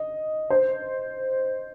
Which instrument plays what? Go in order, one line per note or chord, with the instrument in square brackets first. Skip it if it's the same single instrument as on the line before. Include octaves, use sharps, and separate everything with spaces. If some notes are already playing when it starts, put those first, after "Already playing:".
Already playing: [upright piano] D#5
C5